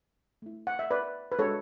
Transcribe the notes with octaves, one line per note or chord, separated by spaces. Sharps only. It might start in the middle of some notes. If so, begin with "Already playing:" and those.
A3 E4
F#5
E5
B4 D5
B4
G#3 D4 F#4 A4 C#5